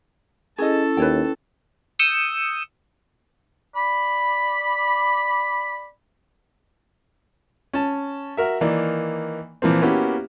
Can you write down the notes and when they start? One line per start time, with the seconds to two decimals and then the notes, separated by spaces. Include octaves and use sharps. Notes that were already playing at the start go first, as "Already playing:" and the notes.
0.58 C#4 E4 G#4 A4 D#5 A5
0.97 D#2 B4 C#5 G5
1.99 D#6 E6 G6 C#7 D#7 E7
3.75 D5 B5
7.74 C#4 A5
8.37 F#4 A#4 E5
8.61 D#3 E3 A#3 D#4 D5
9.62 A#2 E3 F3 A#3 C4
9.82 A#3 B3 C#4 E4 F#4 G4